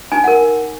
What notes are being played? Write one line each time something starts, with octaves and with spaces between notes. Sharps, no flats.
D#4 G#5
F#5
A#4